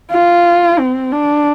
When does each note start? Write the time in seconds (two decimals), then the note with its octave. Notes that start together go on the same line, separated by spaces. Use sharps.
0.11 F4
0.79 C4
1.12 D4